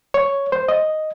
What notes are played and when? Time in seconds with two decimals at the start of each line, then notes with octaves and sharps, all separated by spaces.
0.14 C#5
0.52 C5
0.68 D#5